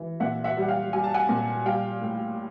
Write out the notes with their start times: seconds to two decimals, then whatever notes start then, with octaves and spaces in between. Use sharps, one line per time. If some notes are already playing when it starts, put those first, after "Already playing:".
Already playing: E3
0.20 A#2 E5 F#5
0.44 E5 F#5
0.57 G3
0.62 F#5
0.68 F5 G5
0.93 G3 G#5
1.04 A5
1.14 F#5 G#5
1.29 A#2
1.65 G3 F5 G5
2.02 A2